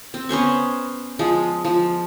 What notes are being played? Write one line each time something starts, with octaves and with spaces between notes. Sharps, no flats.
C4
B3 C#4 C5 C#6
F3 G#3
F3